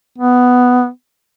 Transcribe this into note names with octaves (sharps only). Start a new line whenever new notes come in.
B3